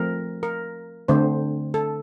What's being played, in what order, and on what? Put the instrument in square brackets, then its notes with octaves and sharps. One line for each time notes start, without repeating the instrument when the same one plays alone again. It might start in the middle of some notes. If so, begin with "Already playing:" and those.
Already playing: [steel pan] F3 A3 C4 A#4
A#4
D3 A3 C4 C5
A4